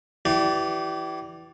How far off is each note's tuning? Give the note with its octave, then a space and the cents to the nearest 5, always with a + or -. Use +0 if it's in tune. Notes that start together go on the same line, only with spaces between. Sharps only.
E3 +0 G4 -30 D5 +0